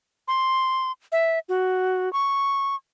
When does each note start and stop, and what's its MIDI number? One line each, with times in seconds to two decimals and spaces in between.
0.28 0.92 84
1.12 1.39 76
1.49 2.11 66
2.13 2.75 85